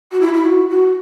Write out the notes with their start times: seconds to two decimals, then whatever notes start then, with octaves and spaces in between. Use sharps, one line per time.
0.12 F#4
0.21 E4
0.34 E4
0.46 F#4
0.69 F#4